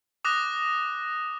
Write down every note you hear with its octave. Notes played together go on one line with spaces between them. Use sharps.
D6 D#6 F#6 A#6